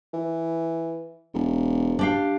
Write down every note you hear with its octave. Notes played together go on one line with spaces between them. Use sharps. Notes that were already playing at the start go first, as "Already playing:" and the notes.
E3
E1
D4 G4 F5